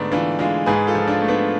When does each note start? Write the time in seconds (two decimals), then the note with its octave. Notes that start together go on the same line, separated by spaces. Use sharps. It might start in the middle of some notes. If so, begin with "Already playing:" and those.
Already playing: G#2 D3 A3 B3 D4
0.12 E3 D4 F4
0.39 G#3 D4 F4
0.66 G#2 G#4 B4
0.87 F4 A4
0.95 F3
1.08 D4 F4
1.22 A3
1.28 B3 D4